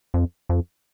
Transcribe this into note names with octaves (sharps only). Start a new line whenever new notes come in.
F2
F2